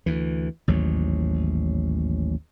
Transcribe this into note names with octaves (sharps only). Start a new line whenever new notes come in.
D2 E3
A1 D#2 G#2 F#3